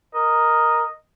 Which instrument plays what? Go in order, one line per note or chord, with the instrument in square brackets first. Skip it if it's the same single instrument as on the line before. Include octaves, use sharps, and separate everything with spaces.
[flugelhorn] A#4 [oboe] D#5